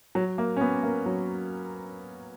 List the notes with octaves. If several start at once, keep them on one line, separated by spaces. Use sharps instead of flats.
F#3
A#3
C#4
B3
A#3
F#3